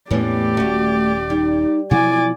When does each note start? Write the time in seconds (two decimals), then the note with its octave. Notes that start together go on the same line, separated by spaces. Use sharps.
0.11 E2 A2 E3 A#3 B3 C#4 G4 D5
0.57 D#1 A3 C#4 F#4
1.30 G3 D#4
1.91 B2 F3 F#3 E4 F#4 D5 G#5